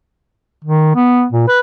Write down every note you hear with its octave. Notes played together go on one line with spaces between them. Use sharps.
D#3
B3
A#2
B4